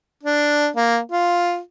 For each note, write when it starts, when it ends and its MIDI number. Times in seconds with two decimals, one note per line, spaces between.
0.23 0.68 62
0.76 0.98 58
1.11 1.59 65